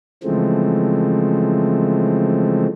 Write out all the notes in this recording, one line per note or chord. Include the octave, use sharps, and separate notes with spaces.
C#3 E3 F3 G#3 A3 C4